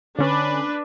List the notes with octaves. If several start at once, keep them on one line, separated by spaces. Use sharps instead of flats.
D3 C#4 D4 B4